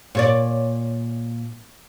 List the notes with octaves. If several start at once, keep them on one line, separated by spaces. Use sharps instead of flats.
A#2 C#5 D5